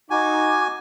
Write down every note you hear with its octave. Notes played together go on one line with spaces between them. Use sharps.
D#4 F#4 G#5 D6